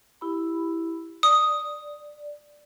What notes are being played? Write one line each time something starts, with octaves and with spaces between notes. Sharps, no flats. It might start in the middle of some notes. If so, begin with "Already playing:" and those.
E4 G4 B5
D5 D#6